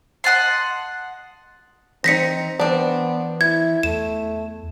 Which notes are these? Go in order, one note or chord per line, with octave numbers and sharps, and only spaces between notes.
D#5 F#5 A5 C6
E3 C4 D#4 C5 A#6 B6 C#7
E3 B3 C4 D4
E4 G#6
E2 A3 E7